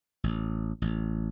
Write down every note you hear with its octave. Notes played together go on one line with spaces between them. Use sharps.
A1
A1